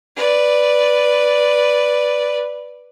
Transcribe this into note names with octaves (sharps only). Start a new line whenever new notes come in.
B4 D5